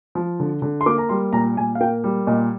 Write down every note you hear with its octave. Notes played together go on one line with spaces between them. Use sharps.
F3
D3
D3
C6
A#3 D6
A#5
G3 C6
A#2 A#5
A#2 G#5
F5
A#3 G5
G3
A#2 D#5